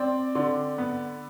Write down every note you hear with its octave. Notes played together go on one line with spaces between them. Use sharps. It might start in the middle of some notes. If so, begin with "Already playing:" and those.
Already playing: C4 D5
D3
B3